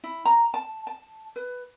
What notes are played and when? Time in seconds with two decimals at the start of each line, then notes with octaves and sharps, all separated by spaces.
0.04 E4
0.25 A#5
0.54 A5
0.87 A5
1.36 B4